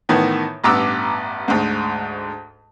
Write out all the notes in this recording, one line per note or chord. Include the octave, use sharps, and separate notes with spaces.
A2 D#3 E3 B3
A1 G2 B3 A#5 D6 E6
D2 G#2